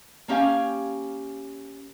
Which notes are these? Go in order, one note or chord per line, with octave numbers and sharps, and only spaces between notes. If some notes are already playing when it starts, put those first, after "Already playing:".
A#3 C#4 G4 F5 G#5